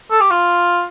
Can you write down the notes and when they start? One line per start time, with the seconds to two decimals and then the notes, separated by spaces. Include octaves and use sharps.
0.11 A4
0.21 G4
0.31 F4